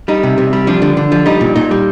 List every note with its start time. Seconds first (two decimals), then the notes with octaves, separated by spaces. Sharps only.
0.08 G3 D#4
0.23 C3
0.38 C3
0.53 G3
0.67 F3 D4
0.82 D3
0.97 D3
1.12 F3
1.26 G3 D#4
1.41 A#2
1.56 A#2 D#4
1.71 G3